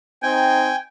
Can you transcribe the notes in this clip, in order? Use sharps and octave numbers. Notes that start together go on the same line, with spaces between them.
C4 D#4 G5 G#5